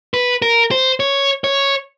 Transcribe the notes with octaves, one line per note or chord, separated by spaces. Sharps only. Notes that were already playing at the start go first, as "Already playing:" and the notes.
B4
A#4
C5
C#5
C#5